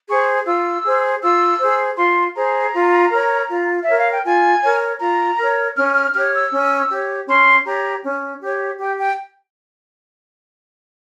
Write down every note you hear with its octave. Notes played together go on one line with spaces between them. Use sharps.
G#4 C5 C#6
F4 E6
G#4 C5
F4 E6
G#4 C5
F4 C6
G#4 C5 A#5
F4
A#4 C#5
F4
A#4 C#5 E5
F5
G5
F4 G#5
A#4 C#5
F4 A#5
A#4 C#5
C#4 F6
F6
G4 C#5 F6
E6
C#4
G4 C#5
C#4 C6
G4 C#5 A#5
C#4
G4 C#5
G4 G5
G5